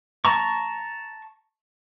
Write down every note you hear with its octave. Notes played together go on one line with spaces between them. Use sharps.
A5 A#5 C#6